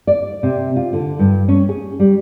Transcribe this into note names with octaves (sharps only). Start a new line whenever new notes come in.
D5
C3
F4
D3
G2
C#4
G#4
G3